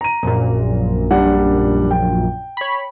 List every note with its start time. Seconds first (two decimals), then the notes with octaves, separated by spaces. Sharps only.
0.01 A#5 D#7
0.23 A#1 F#2 A#2
1.11 G3 D4 F#5
1.91 G5
2.57 C#5 B5